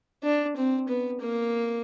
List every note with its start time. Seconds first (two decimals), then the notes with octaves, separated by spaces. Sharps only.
0.23 D4
0.56 C4
0.88 B3
1.21 A#3